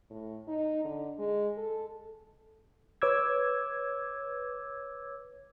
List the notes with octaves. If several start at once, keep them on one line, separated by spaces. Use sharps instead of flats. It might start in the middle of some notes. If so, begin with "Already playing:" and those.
A2
D#4
D3
G#3
A4
B4 C#5 D6 E6 G#6